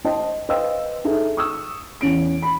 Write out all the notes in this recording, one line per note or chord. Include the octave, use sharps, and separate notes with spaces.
C5 D#5 G5 A5
B4 C5 D#5 F5 G5 E6
D#4 G#4 A4 E5
C#6 D#6 E6
E2 C#4 D7
B5